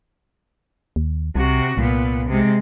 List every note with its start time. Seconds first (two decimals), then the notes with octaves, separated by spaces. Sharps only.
0.96 D#2
1.36 C2 C3 F#4
1.78 C2 A#2 B3
2.29 C3 G#3